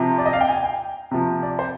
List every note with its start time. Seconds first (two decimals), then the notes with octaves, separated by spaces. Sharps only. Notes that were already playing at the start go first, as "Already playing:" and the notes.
Already playing: C3 F3
0.18 D5
0.26 D#5
0.33 F5
0.41 G5
0.48 G#5
0.64 G5
1.11 C3 F3
1.43 D5
1.59 C5